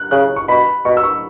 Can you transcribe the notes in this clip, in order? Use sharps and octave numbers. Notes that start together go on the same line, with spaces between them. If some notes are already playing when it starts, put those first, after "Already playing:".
Already playing: F#6
C#3 F#6
C#6
B2 B5
B2 C#6
E6
C#6